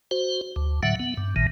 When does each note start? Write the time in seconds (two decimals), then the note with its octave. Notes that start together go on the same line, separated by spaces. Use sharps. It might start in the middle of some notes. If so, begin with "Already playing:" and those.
0.11 F#4 C5
0.56 D2
0.83 A2 D3 F#3 E5 F#5
0.99 B3
1.17 G2
1.36 A1 A#2 D#3